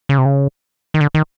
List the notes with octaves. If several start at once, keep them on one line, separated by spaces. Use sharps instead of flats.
C#3
C3
C#3
D#3
D3
D#3